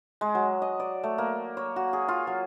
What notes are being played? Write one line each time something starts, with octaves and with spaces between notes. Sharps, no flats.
G#3
F#3
D#5
D5
A3
A#3
C#5
F#4
G#4
F4
F#3